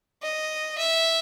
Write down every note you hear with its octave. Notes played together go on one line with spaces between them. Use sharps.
D#5
E5